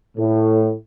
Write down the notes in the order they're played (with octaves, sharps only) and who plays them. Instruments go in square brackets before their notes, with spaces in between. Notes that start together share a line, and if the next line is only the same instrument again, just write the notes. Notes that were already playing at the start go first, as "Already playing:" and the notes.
[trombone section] A2